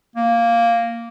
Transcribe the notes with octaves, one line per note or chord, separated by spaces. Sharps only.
A#3